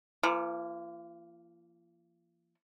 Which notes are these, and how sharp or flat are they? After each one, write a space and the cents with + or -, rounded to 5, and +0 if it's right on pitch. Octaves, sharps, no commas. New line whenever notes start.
F3 -45 A#3 +0